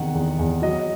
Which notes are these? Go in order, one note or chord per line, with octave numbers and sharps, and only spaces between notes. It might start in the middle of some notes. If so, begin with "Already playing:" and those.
Already playing: E2 C3 D#3 F#5
E2
E2
F#3 D#5